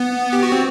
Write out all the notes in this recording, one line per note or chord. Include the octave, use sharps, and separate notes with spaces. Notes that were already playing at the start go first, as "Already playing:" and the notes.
Already playing: B3
G4
F#4
C4